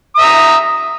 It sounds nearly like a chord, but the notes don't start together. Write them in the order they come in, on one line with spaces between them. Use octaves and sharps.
D#6 E5 A#5